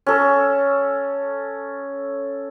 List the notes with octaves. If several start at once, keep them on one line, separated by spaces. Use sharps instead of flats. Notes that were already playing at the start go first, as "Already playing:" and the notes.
C#4 A4